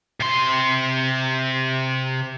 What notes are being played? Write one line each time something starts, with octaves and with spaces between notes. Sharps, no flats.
C3 C6